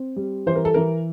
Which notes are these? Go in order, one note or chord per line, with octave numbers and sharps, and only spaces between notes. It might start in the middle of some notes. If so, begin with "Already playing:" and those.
Already playing: C4
G3
E3 C5
A#4
A4
E3 A#4